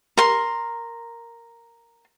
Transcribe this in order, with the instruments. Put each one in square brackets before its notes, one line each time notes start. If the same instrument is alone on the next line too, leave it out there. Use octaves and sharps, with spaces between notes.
[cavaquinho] A#4 C6